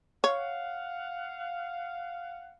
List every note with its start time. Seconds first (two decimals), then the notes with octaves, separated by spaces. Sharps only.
0.24 C#5 F5 F#5